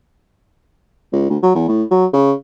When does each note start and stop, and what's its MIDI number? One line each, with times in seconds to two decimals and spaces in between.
1.13 1.26 37
1.30 1.38 38
1.43 1.50 54
1.55 1.68 40
1.68 1.84 45
1.91 2.06 54
2.13 2.33 49